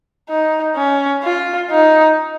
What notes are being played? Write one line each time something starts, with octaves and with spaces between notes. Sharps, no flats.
D#4
C#4
F4
D#4